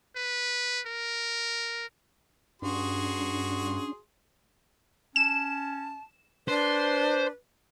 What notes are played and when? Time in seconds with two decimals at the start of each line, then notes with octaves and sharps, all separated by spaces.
0.16 B4
0.86 A#4
2.62 G2 C#4 D4 F#4 G#4 C6
5.16 C#4 A5 E7
6.49 D4 B4 C5